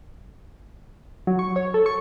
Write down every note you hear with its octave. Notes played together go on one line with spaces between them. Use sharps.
F#3
C#6
C#5
A4
C#6